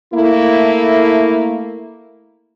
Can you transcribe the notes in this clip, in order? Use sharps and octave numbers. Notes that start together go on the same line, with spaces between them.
A3 A#3 E4